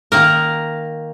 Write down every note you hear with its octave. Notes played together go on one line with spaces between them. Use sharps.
D#3 A#3 A#4